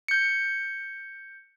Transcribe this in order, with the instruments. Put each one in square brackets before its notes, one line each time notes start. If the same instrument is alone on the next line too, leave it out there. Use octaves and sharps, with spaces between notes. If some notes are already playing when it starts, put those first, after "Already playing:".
[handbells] G6 C#7